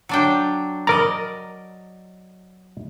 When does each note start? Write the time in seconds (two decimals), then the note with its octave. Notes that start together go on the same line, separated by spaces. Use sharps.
0.09 F#3 D4 G5
0.87 A#4 D5 D#5 A#5